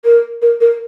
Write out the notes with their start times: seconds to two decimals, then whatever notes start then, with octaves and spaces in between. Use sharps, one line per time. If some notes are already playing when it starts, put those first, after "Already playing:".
0.05 A#4
0.42 A#4
0.61 A#4